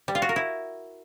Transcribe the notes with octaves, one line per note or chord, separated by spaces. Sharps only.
G3
F4
F#4
A#4
E4